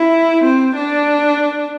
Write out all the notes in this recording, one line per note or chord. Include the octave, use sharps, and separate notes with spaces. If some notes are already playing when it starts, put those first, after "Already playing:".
Already playing: E4
C4
D4